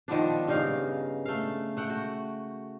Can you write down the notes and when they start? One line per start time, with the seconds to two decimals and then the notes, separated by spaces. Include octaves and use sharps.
0.08 D#3 F3 B3 D4
0.47 G2 C#3 D#4 F5
1.25 A3 F5
1.77 A3 F#5 G5
1.90 F#4